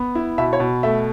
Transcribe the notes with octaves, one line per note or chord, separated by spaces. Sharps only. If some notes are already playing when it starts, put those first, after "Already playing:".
Already playing: B3
E4
B2 E5
C#5
B2
A3 E5